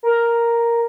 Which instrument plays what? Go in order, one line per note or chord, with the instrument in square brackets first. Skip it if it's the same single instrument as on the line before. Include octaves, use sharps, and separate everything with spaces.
[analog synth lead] A#4